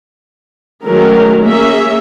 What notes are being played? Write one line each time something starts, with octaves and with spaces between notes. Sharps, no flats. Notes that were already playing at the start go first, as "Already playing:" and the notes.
D#3 F#3 G#3 A3 C#4 A#4
A#3 C#4 G#4 E5